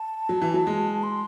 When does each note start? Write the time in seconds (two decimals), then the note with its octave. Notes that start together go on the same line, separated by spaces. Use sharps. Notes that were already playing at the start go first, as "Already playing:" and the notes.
Already playing: A5
0.29 F#3
0.41 E3
0.54 F#3
0.67 G#3
1.03 C6